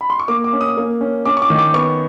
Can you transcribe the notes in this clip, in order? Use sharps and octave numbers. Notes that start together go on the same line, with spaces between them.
B5
C6
C#6
A#3 D6
D6
C#4
D#6
A#3
C#4
C#4 D6
C#6
D6
D#3
D6
B3 C#6